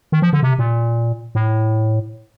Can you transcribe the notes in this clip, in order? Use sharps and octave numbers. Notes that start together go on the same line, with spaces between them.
D#3
F3
D3
C3
A#2
A2